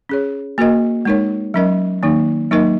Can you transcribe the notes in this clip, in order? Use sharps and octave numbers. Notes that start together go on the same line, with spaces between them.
C#4 G#4 C#5
A#3 F#4 A#4 D#5
G#3 D#4 A#4 C#5
F#3 C#4 A#4 D#5
D#3 A#3 D#4
F#3 A#3 D#4 A#4 D#5